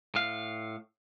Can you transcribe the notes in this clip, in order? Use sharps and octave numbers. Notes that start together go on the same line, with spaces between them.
A2 F5